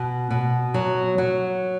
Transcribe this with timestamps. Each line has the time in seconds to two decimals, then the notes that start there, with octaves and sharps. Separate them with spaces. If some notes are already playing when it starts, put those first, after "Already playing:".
Already playing: B2
0.30 B2
0.74 F#3
1.18 F#3